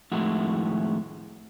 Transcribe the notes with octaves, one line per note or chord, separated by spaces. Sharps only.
F2 A2 D#3 G#3 E4 F#4